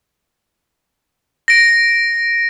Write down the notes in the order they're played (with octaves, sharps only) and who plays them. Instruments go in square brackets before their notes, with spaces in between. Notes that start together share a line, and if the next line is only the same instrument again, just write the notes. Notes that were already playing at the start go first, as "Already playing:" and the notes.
[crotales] A#6 D7